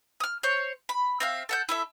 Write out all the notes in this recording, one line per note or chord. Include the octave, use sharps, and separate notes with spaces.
D#6 F6
C5 C#5
B5
C4 E5 F5
A4 F#5 G6
E4 A4 E5